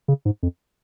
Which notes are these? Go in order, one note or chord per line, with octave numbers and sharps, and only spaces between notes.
C#3
G#2
F2